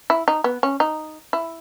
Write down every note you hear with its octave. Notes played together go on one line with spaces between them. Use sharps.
E4
D#4
B3
C#4
D#4
E4